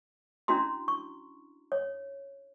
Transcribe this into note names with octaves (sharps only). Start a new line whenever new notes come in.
C#4 D4 E4 F#4 A#5 C6
C#6
C#5